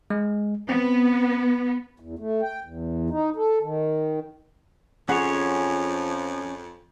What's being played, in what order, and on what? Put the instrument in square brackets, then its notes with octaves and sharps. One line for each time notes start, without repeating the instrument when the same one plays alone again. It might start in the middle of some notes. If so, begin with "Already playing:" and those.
[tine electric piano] G#3
[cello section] B3 [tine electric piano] C4
[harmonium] E2
A3
G5
E2
D#4
A4
D#3
[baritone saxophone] F2 [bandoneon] F3 [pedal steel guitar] C#4 C#5 [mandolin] G#4 F#5